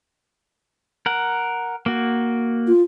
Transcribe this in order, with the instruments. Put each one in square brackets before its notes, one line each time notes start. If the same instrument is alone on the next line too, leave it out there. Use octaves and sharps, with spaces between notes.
[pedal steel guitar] A#4 F#5
A#3 F#4
[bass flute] F4